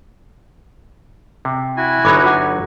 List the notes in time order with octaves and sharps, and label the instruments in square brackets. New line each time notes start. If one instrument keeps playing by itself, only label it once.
[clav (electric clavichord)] C3
[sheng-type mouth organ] E4 F#4 G#5
[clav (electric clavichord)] G1 F#3 D#4 [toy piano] B5 D6
[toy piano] F4 F#5 D6